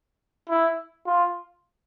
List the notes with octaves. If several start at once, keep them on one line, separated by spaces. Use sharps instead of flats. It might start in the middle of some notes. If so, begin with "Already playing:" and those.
E4
F4